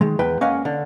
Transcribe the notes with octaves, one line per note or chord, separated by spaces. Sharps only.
D#3 G#3
E2 B4 G5
A#3 C#4 D#5 F5 F#5 G#5
D3